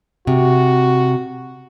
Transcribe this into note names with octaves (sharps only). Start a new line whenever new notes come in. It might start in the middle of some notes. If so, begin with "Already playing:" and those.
C3 F#4